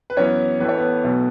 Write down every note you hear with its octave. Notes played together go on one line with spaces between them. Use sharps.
B4
F#2 E3 B3 C#4 C#5
A1 A2 E3 A3 B4
C#5
B3 B4
B1 B2 A3